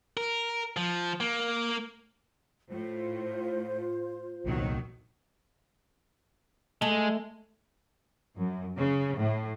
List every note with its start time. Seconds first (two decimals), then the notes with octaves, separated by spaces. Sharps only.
0.17 A#4
0.77 F3
1.20 A#3
2.70 A2 F4 C5
4.46 C2 A#2 D#3 F#3
6.82 G#3 A3
8.38 F#2
8.76 C#3
9.19 A2